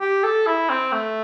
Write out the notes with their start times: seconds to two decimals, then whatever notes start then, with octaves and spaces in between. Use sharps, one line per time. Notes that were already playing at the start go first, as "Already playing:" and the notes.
0.01 G4
0.24 A4
0.47 E4
0.69 C4
0.92 A3